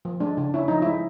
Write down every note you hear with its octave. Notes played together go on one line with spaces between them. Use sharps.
F3
G#3 D4
C#3 D4
C#4 E4
F3 D#4
G#3 E4